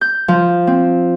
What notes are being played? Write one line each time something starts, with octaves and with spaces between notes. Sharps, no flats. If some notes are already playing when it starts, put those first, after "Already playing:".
G6
F3
C4